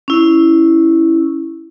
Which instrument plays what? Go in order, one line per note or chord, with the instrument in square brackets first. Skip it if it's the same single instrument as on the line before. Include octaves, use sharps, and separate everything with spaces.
[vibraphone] C#4 E4